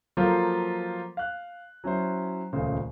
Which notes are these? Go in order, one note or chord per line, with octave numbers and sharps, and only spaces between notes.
F3 F#3 A#3 F4 A4 C5
F5 F#6
F#3 C#4 E4 C5
D#1 C#2 C#3 A3 C5